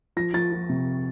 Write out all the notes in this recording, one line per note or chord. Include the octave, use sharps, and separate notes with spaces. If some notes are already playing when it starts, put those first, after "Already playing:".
F3 A#6
F3 A6
F3
C3